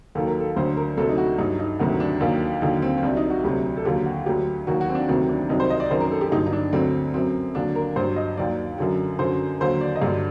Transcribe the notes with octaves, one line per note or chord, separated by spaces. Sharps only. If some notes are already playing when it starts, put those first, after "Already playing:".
D#2 D#3 F#3 A4
A#4
A4
D2 D3 F#3 C5
A#4
D2 C3 F#3 A4
D#4
F#4
G2 F#3 D#4
D#4
D2 C3 D#3 F#3 F#4
D4
D#2 D#3 F#3
D#2 D3 F#3 D#4
C4
C4
C2 C3 F#3 D4
D#4
F#4
D2 C3 F#3 G4
A4
D#2 D3 F#3 G4
F#4
D2 D3 F#3 G4
D#2 D#3 F#3 F#4
F#4
C4
D4
D2 C3 D#3 F#3 C4
D4
C2 C3 D#3 F#3 D#4
C5
D#5
D5
F#2 D#3 F#3 C5
A#4
A4
G4
G2 D3 F#3 D#4
D#4
D4
D2 D3 F#3 C4
F#2 F#3 C4
D#2 D3 F#3 D4
A#4
G2 F#3 C5
D#5
D#2 D#3 F#3 D5
F#2 D3 F#3
F#2 D3 F#3 C5
D#2 D3 F#3 C5
D5
D#5
G2 D3 F#3 D5